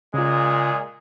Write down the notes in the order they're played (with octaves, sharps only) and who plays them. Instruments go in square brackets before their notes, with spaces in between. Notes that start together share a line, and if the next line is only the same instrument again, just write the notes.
[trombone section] A#2 G#3 G#4 [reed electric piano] C#3 F4